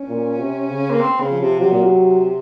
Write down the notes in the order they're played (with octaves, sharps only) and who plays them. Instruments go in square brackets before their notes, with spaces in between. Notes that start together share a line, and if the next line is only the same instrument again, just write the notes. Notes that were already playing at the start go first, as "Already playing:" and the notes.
Already playing: [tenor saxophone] C#4
[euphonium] A#2
C3
C#3
[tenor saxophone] A#3
C4
C#3
[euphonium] F3
[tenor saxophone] C3
[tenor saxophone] C3 [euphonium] F#3
[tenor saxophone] A#2
C3